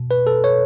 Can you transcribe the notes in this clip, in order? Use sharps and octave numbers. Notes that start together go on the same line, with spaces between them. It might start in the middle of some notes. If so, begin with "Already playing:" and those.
Already playing: B2
B4
A4
C#5